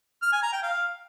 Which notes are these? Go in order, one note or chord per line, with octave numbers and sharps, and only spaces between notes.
F6
G#5
A#5
G5
F5